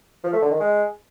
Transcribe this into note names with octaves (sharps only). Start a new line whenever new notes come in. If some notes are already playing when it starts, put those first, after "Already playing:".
F3
A3
D3
D#3
G#3